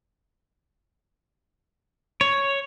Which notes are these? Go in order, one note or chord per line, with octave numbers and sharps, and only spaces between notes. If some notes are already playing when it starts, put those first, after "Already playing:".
C#5